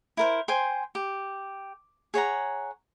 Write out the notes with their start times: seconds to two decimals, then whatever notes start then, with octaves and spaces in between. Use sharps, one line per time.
0.17 E4 A#4 C5
0.48 C5 G5 G#5 C6
0.95 G4
2.14 G#4 C#5 F#5 A#5